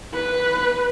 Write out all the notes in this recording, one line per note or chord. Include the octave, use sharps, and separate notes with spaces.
B4